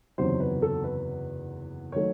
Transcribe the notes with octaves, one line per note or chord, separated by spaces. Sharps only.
F#1 E2 C3 D#3 F#3 C5
B4
A4
B4
D#3 F#3 A3 C#5